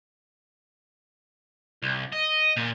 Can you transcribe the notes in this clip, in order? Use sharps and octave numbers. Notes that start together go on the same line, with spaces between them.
C2
D#5
A#2